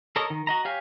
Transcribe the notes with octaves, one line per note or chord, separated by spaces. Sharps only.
A4 A#4 C#5 D#5
D#3
F#4 D#5 A#5
G4 C#5 F5 G#5